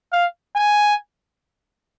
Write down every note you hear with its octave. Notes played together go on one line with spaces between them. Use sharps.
F5
G#5